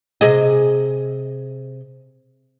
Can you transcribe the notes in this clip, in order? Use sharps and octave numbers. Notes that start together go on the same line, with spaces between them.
C3 G#4 D#5